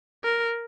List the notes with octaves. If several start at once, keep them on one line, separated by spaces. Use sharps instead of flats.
A#4